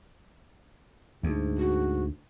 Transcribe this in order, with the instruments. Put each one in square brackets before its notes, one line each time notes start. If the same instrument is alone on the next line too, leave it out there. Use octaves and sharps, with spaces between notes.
[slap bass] D2 [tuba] G#2
[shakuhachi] F#4